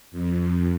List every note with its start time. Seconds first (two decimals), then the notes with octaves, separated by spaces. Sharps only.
0.12 F2